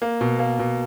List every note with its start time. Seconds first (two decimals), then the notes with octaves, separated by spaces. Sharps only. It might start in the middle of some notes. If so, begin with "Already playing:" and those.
0.02 A#3
0.21 B2
0.39 A#3
0.59 B2